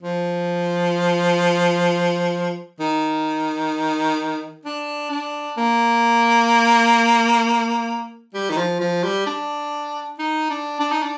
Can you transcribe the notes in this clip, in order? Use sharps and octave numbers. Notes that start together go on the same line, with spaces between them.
F3
D#3
D4
D4
A#3
G3
D#3
F3
F3
G3
D4
D#4
D4
D4
D#4
D4